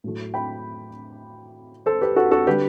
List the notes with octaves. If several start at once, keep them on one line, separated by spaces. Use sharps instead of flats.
A2 F#3 A3
G5 B5
A4 C5
G4 B4
F#4 A4
F#4 A4
D3 G3 G4 B4